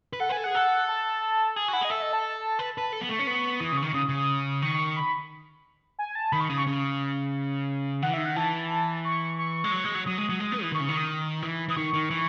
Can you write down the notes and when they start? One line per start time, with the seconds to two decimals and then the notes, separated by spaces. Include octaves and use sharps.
0.13 B4
0.20 A4 F#5
0.29 B4
0.32 A4 G#5
0.44 G#4 F#5
0.55 A4
0.88 A5
1.56 G#4 G#5
1.68 F#4
1.73 E4 F#5
1.81 G#4 D#5
1.90 A4 E5
2.02 D#5
2.13 A5
2.59 B4
2.78 B4
2.93 A4
3.01 B3
3.09 A3 C#6
3.19 C#4
3.27 B3 C#6
3.60 E3 D#6
3.72 C#3
3.77 C#6
3.83 D#3
3.94 C#3 D#6
4.09 C#3
4.16 D#6
4.62 D#3 C#6
4.96 B5
5.99 G#5
6.15 A5
6.32 D#3 B5
6.41 C#6
6.49 C#3 D#6
6.58 C#6
6.67 C#3
8.02 D#3 F#5
8.10 E3
8.14 D#3 E5
8.25 F#5
8.36 E3 A5
9.05 C#6
9.38 C#6
9.64 G#3
9.72 F#3
9.84 G#3
9.95 F#3
10.06 F#3 D#6
10.18 G#3
10.29 F#3
10.40 G#3
10.52 B3
10.63 E3
10.72 D#3 C#6
10.80 C#3
10.86 D#3 C#6
10.97 D#6
11.43 E3
11.68 E3 D#6
11.76 D#3 C#6
11.93 D#3
12.10 E3